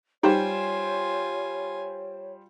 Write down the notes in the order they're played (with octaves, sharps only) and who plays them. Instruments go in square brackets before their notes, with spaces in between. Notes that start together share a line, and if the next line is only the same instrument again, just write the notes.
[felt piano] G3 C5 G5 [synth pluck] D#4 G4 [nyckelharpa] F4 G#5 [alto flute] C#5